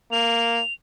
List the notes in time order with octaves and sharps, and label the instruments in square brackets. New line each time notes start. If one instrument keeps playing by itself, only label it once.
[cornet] A#3 [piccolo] F7